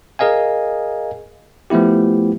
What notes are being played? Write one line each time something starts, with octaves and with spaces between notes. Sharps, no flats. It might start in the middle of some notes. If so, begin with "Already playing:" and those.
G#4 A#4 D#5 F5 G#5
F3 A3 B3 E4 G4